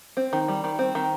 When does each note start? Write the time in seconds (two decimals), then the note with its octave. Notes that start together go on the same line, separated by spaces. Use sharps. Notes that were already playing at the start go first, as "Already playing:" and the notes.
0.17 C4
0.33 D#3
0.48 G3
0.64 D#3
0.79 C4
0.95 D#3